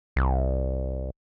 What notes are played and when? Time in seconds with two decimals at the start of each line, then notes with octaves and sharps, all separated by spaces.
0.16 C2